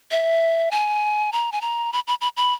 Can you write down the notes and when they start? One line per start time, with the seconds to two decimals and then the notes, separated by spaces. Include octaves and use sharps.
0.11 E5
0.71 G#5
1.32 A#5
1.52 G#5
1.61 A#5
1.93 B5
2.07 B5
2.21 B5
2.37 B5